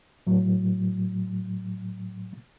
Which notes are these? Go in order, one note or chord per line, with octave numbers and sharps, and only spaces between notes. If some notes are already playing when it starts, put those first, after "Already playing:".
A2 F#3